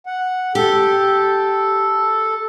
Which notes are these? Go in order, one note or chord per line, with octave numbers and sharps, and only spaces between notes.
F#5
G4 A4